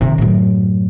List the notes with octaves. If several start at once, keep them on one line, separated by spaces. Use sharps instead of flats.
C3 D#3
F#2 A2